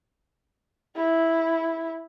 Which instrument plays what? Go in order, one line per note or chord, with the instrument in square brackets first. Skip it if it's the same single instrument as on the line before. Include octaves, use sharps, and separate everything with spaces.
[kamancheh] E4